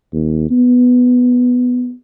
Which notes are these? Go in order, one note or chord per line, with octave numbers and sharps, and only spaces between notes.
D#2
B3